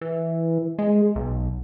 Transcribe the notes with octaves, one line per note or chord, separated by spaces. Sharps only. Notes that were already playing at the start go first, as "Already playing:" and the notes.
E3
G#3
B1